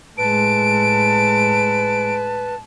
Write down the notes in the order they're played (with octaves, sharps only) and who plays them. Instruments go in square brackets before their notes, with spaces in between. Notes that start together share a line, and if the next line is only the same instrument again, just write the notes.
[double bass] A2 G#3 [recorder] B4 [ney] A5 [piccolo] D7